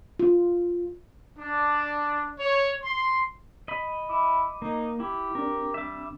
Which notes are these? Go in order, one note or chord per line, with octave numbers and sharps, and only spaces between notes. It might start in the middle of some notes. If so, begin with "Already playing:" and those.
F4
D4
C#5
C6
D#5 B5
E4 D6
A#3 D#4
E4 G4
C4 D4 A#4
G3 E5 D6